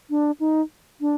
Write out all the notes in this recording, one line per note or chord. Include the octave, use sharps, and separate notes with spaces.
D4
D#4
D4